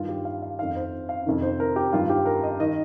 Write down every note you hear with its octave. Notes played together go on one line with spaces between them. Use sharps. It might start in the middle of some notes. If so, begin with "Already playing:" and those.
Already playing: G2 D#3 F4
G4
F5
F5
F2 D#3 F5
C5
F5
F2 C3 D#3
C5
A#4
G4
G2 D#3 F4
G4
A#4
D#5
D#3 D#5